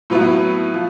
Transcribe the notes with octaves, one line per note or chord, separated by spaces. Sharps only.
A2 F#3 B3 E4
F3